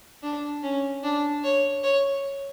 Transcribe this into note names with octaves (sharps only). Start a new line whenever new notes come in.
D4
C#4
D4
C#5
C#5